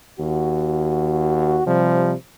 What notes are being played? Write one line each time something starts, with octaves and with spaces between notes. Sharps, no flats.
D#2 F#4
C3 F3 G3